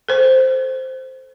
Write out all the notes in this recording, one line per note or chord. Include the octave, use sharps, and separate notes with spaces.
A4 C5